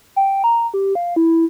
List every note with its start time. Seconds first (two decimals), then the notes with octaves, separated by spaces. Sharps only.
0.16 G5
0.44 A#5
0.74 G4
0.95 F5
1.16 E4